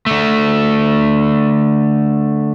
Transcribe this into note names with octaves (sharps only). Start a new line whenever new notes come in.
D3 A3